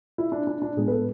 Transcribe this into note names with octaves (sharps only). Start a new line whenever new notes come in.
E4
D4
D4
D4
A2 G#3 B3 G#4
B4
A4